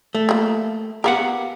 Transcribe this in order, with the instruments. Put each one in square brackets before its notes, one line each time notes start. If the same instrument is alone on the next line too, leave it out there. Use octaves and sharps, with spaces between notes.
[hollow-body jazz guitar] A3
[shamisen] F3 A#3
[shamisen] B3 A#4 [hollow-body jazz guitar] G4 F5 F#5